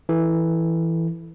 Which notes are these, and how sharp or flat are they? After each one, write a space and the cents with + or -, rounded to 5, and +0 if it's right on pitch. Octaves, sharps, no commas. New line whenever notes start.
E3 +0 A4 +0